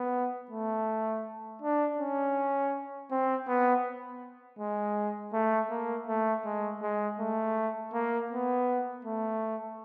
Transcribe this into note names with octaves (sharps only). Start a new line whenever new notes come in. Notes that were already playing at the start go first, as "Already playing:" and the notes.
Already playing: B3
A3
D4
C#4
C4
B3
G#3
A3
A#3
A3
G#3
G#3
A3
A#3
B3
A3